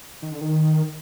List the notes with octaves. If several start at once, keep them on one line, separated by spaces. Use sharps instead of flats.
D#3
D3
D#3